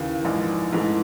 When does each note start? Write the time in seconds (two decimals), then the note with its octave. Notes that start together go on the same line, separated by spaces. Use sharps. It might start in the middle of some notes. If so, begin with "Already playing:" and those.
Already playing: D#2 C#3 E3
0.23 A#1 G#2 E3
0.72 A#1 G#2 E3 A3